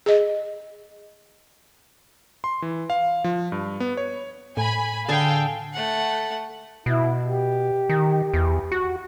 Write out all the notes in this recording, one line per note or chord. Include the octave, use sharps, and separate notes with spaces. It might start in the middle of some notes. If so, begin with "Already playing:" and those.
G#4 D#5
C6
E3
F5
F3
G2
B3
C#5
A2 G#5 B5
D3 G#4 A4 F5 G5 A5
A3 F#5
B2 E4
G4
D#3
E2
F#4